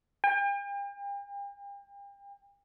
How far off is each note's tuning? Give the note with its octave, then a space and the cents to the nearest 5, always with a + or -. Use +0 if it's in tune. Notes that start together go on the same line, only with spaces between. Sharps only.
G5 +40